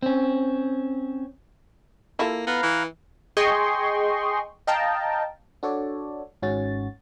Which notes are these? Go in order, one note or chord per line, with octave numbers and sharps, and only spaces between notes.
C4 C#4
A#3 E4 F4 A4
B3 B4 F5 A#5
E3
G#4 D#5 G5 C6 C#6
D#5 F5 G5 A5 A#5
D4 F#4 A4 C#5 D5
G#1 G#2 C#4 F#4 C#5 A6